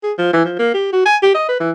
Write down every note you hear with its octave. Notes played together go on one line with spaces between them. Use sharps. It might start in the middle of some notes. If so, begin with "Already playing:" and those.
G#4
F3
E3
F3
A#3
G4
F#4
G#5
G4
D#5
B4
E3